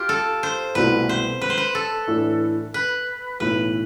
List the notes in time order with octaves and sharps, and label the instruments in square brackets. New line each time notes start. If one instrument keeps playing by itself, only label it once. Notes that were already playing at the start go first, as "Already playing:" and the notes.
Already playing: [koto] F4 G4
A4
C5
[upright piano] C2 B2 A3 C4 E4 [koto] B4
[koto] C5
B4
C5
B4
A4
[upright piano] A2 E3 A3 D4
[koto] B4
[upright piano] B1 A2 E3 A3 E4 [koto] B4